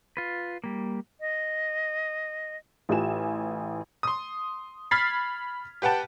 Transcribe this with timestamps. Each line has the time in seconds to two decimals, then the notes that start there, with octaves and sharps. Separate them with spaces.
0.17 F4 B4
0.64 G3 A#3
1.20 D#5
2.89 A1 F4 G4 G#5 E7
4.03 C6 D#6
4.91 B5 F6 G#6 A6 B6 C7
5.82 G4 B4 F#5 G5 A5